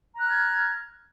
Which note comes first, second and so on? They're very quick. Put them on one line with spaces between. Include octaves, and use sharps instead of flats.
A#5 F#6 F6 G#6